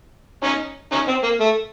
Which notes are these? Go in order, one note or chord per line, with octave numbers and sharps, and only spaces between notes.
C#4 D#4
C#4 D#4
C4
A#3
A3